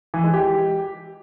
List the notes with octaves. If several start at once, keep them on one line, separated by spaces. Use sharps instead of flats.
E3
G#3
G4